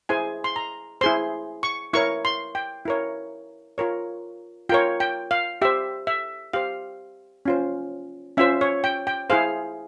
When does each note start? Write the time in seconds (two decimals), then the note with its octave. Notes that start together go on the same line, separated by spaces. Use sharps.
0.09 E4 G#4 C5 G#5
0.44 C6
0.56 A#5
1.01 E4 G#4 C5 C6
1.63 C#6
1.93 E4 A#4 C#5 C#6
2.25 C6
2.55 G5
2.85 E4 A#4 C#5
3.78 F4 A#4 C#5
4.69 F4 A#4 C#5 G5
5.00 G5
5.31 F5
5.62 G4 C5 E5
6.07 E5
6.53 G4 C5 F5
7.45 C#4 F4 C5
8.37 C#4 F4 C5 E5
8.61 C#5
8.84 G5
9.07 G5
9.30 E4 G#4 C5 F5